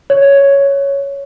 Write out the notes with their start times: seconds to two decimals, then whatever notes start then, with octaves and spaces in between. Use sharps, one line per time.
0.10 C#5